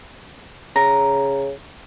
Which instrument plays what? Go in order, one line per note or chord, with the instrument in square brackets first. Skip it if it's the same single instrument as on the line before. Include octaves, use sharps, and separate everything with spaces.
[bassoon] C#3 [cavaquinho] A#5